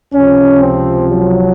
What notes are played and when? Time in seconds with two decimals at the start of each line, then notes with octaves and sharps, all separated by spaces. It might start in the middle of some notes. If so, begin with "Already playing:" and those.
0.13 C#2 C3 F3 C#4
0.60 C4
1.07 F#3